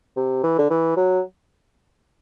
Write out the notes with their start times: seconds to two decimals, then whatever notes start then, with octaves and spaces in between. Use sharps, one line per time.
0.16 C3
0.43 E3
0.59 D3
0.70 E3
0.96 F#3